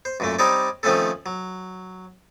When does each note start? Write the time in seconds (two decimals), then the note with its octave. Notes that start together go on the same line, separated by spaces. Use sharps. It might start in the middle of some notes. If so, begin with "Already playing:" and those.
0.05 C5
0.20 F#2 A#2 A3
0.39 G3 C4 D#4 C#5 D5
0.83 D#3 F3 A3 C4 C#4 A4
1.26 F#3